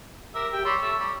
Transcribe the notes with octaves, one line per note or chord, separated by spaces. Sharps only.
G4 A#4 E5
G4 E5 G5
G3 C#5 C6 E6
A3 A5 E6
G3